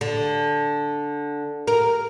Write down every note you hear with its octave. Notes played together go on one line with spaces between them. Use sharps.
D3
A#4